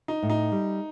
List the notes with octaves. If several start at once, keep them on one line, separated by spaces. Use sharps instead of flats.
D#4
A2
D#4
G3